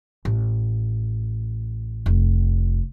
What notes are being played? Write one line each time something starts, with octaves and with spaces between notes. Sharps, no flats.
A1
F1